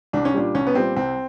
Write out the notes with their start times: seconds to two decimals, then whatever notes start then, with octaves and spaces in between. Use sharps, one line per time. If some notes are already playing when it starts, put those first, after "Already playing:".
0.13 C2 D4
0.25 C#4
0.34 A#2 G3 D4
0.54 C2 C#4
0.67 B3
0.75 A#2 G3 C4
0.96 C2 C4